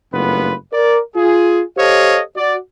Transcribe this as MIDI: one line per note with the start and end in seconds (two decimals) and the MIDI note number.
0.13 0.53 30
0.13 0.53 43
0.13 0.53 57
0.13 0.53 59
0.13 0.53 65
0.13 0.53 71
0.72 0.98 70
0.72 0.98 74
1.15 1.62 65
1.15 1.62 68
1.77 2.20 67
1.77 2.20 69
1.77 2.20 72
1.77 2.20 73
1.77 2.20 75
1.77 2.20 77
2.36 2.56 66
2.36 2.56 74